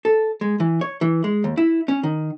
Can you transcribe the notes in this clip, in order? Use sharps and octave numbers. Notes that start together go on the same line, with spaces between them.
A4
G#3
E3
C#5
E3
G#3
D#2
E4
C#4
D#3